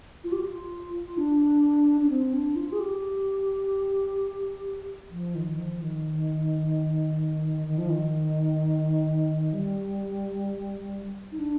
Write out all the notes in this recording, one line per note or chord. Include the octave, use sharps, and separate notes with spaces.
F4
G4
F4
D4
D4
C4
D4
F4
G#4
G4
F3
D#3
F3
D#3
D#3
F3
D#3
G3
D#4
D4